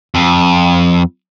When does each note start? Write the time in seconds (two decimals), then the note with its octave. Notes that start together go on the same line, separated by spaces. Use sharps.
0.15 F2